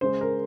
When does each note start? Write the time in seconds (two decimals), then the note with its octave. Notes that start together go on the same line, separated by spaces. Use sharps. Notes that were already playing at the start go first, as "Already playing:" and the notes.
0.01 C#3 G#3 C5
0.21 A#4